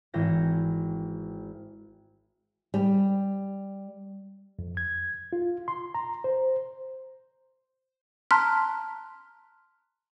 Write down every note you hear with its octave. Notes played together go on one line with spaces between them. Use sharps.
G#1 E3 G5 A#6
G3
F2
G#6
F4
C6
A#5
C5
A5 A#5 C6 F6 F#6 B6